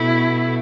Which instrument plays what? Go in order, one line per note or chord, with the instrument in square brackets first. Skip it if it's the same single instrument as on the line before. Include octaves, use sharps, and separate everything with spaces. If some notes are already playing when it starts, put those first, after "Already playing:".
Already playing: [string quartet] B2 A3 E4